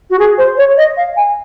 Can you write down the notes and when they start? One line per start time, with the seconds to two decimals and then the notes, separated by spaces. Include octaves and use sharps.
0.10 F#4
0.19 G#4
0.38 C5
0.58 C#5
0.77 D#5
0.97 F5
1.17 G#5